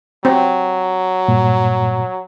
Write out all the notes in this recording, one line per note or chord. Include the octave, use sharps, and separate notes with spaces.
F#3 C4
G2 A#2